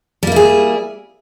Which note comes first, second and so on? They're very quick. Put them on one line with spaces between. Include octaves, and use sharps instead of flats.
G3 A#3 E4 G#4